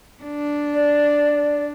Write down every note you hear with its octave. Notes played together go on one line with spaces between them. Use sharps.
D4
D5